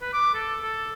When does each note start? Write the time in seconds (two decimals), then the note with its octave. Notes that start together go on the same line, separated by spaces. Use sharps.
0.02 B4
0.13 D6
0.34 A4
0.62 A4